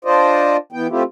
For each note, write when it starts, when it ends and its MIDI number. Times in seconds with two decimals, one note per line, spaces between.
0.05 0.57 62
0.05 0.57 65
0.05 0.57 72
0.05 0.57 74
0.05 0.57 75
0.72 0.87 52
0.72 0.87 59
0.72 0.87 79
0.89 1.03 57
0.89 1.03 60
0.89 1.03 64
0.89 1.03 65
0.89 1.03 67